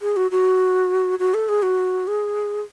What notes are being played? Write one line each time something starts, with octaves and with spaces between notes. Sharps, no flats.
G#4
F#4
F#4
F#4
A4
G#4
F#4
G#4